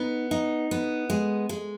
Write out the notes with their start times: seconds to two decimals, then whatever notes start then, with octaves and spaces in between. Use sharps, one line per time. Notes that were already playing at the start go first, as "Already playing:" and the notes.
Already playing: B3 D#4
0.31 D#4
0.71 B3
1.10 G#3
1.49 G#3